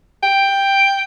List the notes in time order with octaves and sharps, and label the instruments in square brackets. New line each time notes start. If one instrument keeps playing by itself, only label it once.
[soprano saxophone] G5